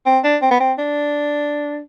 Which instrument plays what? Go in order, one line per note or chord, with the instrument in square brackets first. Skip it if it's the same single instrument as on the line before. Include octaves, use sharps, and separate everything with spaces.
[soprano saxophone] C4
D4
C4
B3
C4
D4